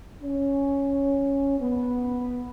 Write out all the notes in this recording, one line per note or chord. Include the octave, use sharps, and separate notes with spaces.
C#4
B3